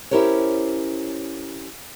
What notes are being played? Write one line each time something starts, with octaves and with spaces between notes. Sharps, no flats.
C#4 E4 G4 A#4 C5 C#5